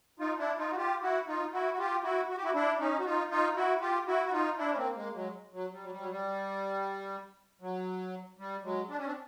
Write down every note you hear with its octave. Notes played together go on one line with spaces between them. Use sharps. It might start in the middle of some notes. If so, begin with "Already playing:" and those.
D#4 F4
D4 E4
D#4 F4
F#4
F4 G4
E4 F#4
D#4 F4
E4 F#4
F#4
F4 G4
E4 F#4
F#4
G4
E4 F#4
D4 E4
C#4 D#4
F#4
D#4 F4
D#4 F4
E4 F#4
F4 G4
E4 F#4
F#4
D#4 F4
D4 E4
C#4
A#3 C4
G#3 A#3
F#3 G#3
F#3
G3
F#3
G3
F#3
G3
F#3
G3
F#3 G#3
D4
C#4
C4 D4